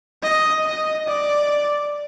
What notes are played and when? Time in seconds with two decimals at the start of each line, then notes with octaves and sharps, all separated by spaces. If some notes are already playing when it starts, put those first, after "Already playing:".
0.23 D#5
0.66 D#5
1.08 D5